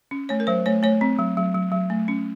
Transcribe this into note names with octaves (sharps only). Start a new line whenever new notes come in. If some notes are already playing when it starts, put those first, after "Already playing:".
C#4
A3 C#5
A#4
F#3 C5
A3 C#5
A3 C#5
C4
F#3
F#3
F#3
F#3
A3
C#4